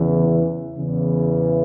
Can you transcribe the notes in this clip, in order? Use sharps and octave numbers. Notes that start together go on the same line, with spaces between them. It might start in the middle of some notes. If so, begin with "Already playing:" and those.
Already playing: E2 C#3 E3
E2 C#3 E3